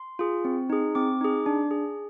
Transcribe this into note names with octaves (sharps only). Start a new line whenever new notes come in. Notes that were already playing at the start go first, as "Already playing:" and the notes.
Already playing: C6
F4 G#4
C4
D#4 G#4
C4 D6
D#4 G#4
D4
G#4